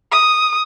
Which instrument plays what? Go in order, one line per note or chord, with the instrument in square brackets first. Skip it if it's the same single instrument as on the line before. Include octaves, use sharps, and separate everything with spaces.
[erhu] D#6